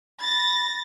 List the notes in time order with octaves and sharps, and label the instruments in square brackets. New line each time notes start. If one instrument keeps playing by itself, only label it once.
[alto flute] B5 [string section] A6 A#6